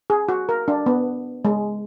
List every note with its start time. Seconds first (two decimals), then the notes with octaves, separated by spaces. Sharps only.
0.10 G#4
0.29 F#4
0.49 A#4
0.68 D4
0.86 B3
1.45 G#3